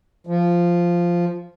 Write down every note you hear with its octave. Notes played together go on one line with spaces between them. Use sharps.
F3